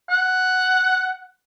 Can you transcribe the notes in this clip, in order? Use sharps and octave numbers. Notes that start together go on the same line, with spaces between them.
F#5